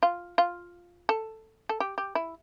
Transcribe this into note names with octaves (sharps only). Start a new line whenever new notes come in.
F4
F4
A4
A4
G4
G4
E4